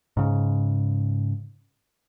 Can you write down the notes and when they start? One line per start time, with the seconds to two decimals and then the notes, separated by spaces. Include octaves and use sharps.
0.17 G#2 C#3